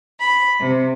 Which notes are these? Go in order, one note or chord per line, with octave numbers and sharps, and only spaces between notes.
B5
C3